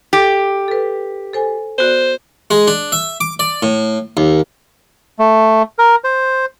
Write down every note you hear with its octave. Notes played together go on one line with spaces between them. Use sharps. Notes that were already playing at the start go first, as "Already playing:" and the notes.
G4 A4
A4 B4
A4 C5 G#5
B3 F#4 C5 D5
G#3
D4
E5
D6
D5
A2
D#2
A3
A#4
C5